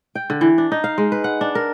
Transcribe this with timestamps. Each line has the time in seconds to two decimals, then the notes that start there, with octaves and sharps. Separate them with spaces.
0.15 G5
0.30 D3
0.41 E3
0.58 D4
0.72 D#4
0.84 F5
0.98 G#3
1.12 B4
1.24 F#5
1.41 D4
1.55 A#4